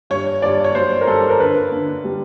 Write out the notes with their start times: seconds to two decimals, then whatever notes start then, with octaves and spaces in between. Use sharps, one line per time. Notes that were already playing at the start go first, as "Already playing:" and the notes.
0.10 G2 C#5
0.42 G2 D5
0.64 C#5
0.75 F#3 C5
1.01 A#4
1.07 G2 A4
1.29 A#4
1.39 D3 B4
1.72 D3
2.04 G3